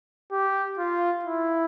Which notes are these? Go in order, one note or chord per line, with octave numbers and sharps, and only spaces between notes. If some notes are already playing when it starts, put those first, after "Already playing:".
G4
F4
E4